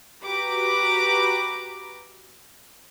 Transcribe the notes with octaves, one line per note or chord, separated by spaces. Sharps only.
F#4 G4 B4 A#5 D6